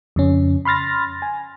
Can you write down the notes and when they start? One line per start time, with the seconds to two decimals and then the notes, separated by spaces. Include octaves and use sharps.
0.16 F2 C#3 C#4
0.65 B5 C6 F6 A6 A#6
1.22 G#5